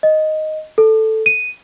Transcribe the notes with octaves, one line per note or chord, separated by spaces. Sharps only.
D#5
A4
D#7